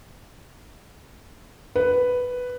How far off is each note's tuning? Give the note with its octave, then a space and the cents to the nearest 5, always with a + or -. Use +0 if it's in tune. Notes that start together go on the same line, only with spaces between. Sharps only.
B4 +5